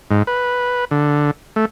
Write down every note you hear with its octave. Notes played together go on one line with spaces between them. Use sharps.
G#2
B4
D3
A3